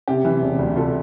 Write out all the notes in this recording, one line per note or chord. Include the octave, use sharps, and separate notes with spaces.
C3 G4
E3
E1
D2
C3 F4 A4